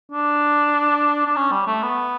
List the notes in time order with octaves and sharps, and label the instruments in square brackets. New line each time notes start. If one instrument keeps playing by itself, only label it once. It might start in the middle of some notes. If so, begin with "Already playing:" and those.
[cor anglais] D4
D4
C#4
G3
A3
B3